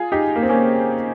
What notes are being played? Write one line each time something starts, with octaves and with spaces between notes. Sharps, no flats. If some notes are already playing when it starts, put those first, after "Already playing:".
Already playing: F4 G#4
D#4 G4
A#3
C4
A#3 C#4